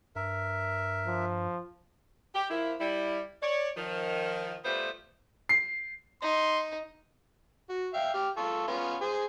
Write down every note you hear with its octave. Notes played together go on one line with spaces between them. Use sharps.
G2 A#4 E5
F3
G4
F3 A#3 E4
G3 E4
C#5 D5
D#3 F3
G3 A3 B3 F4 B4 C5
C7
D#4 C6
F#4
E5 F5 G5
G4 F6
F4 A4 C#6
B3 C#4 F4
G#4 C5 G#5